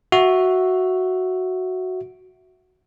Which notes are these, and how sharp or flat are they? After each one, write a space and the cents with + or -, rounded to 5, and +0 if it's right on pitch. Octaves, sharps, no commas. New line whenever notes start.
F#4 +0 E5 +0